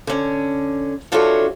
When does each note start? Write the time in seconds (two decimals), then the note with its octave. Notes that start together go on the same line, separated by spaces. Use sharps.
0.07 D3 C#4
1.12 E3 D4 F4 F#4 A4 C#5